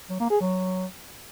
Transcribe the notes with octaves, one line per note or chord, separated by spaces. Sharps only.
F#3
A#3
G#4
F#3